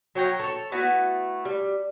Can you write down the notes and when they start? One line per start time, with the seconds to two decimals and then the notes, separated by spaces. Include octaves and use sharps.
0.15 F#3 C#5 G5 A#5
0.39 A4 C#5
0.72 A3 B3 E4 F#4
1.45 G3